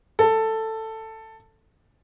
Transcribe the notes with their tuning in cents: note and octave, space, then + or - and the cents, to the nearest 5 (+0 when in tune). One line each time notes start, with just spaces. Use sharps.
A4 +10